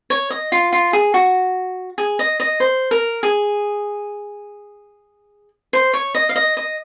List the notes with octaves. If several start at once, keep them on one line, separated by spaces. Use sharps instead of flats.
C#5
D#5
F4
F4
G#4
F#4
G#4
D#5
D#5
C5
A#4
G#4
C5
C#5
D#5
F5
D#5
D#5